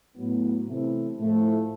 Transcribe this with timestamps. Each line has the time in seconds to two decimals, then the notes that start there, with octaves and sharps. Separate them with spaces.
0.17 A2 F#3 B3
0.67 C3 E3 A3 C4 E4
1.18 A2 F3 A3